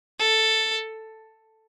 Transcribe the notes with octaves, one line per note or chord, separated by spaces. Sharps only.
A4